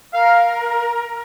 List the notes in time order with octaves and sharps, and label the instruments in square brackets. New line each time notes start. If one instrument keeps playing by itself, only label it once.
[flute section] A#4 [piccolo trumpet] F5